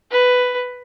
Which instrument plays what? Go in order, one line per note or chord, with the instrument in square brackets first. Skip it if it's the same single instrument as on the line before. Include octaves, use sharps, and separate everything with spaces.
[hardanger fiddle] B4